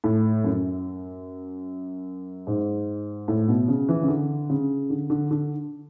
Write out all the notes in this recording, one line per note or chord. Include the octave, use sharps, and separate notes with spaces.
A2
F#2
G#2
A2
B2
C#3
E3
C#3
D3
C#3
D3
D3
D3